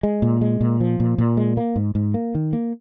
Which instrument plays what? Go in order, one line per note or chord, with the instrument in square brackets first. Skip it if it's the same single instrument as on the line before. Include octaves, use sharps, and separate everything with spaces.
[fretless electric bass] G#3
A#2
G#3
A#2
F3
A#2
A#2
G#3
A#3
G#2
G#2
A#3
D#3
A#3